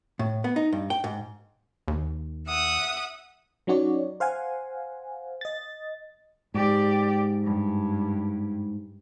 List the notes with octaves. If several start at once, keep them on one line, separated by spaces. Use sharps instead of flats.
A2
B3
D#4
G2
G5
G#2
D#2
E5 F#5 D#6
F#3 C#4 D#4 F#4 C#5 D5
C5 F5 F#5 G#5
D#5 A6
G#2 G4 D5
G2